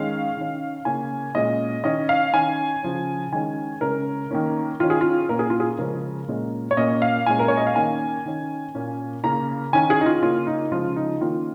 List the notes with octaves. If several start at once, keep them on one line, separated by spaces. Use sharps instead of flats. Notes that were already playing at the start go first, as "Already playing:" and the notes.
Already playing: D#3 G#3 C#4 F5
D#3 C#4
C#3 A#3 C#4 G#5
A#2 G#3 C#4 D#5
D#3 C#4 D#5
F5
D#3 C#4 G#5
C#3 F3 C#4
D#3 G#3 C#4 G#5
C#3 G#3 C#4 A#4
D#3 A#3 C#4
D#3 C#4 F4
G#4
F4
A#2 A#3 C#4 A#4
G#4
F4
G#4
C#3 F3 G#3 C#4 A#4
A#2 G#3 C#4
C#5
A#2 A#3 C#4 D#5
F5
A#2 G#3 C#4 G#5
A#4
C#5
D#5
F5
D#3 A#3 C#4 G#5
D#3 C#4
A#2 A#3 C#4
C#3 A#3 C#4 A#5
D#3 C#4 G#5
G#4
D#4
F4
C#3 A#3 C#4 F4
D#4
C#3 F3 G#3 F4
D#4
D#3 A#3 C#4 F4